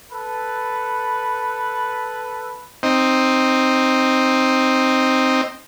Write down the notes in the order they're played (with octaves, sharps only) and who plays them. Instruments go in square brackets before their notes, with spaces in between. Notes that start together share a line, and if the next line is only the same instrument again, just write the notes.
[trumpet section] A4 B4
[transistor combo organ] C4 D#4